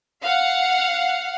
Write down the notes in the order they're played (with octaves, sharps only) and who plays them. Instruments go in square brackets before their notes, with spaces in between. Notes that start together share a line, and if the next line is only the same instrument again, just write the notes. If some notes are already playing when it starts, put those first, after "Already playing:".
[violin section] F5 F#5